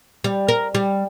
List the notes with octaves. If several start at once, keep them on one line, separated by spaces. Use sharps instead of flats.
G3
A#4
G3